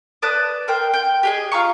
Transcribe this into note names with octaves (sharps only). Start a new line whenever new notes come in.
B4 D5 A5 D#6
A#4 C5 G5
G5
G4 G#4 D#5
F4 F5 A#5 C#6